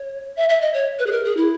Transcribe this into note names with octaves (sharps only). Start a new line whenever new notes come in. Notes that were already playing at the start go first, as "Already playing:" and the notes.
Already playing: C#5
E5
E5
D#5
C#5
B4
G#4
A#4
G#4
E4